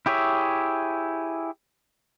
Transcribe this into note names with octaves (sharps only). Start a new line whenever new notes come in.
E4 G4 G#4 C#5 E5